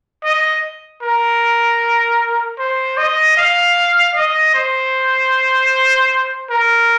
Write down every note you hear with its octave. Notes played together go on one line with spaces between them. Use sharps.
D#5
A#4
C5
D#5
F5
D#5
C5
A#4